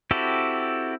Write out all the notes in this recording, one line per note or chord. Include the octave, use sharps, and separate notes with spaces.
C4 E4 F#4 G4 A4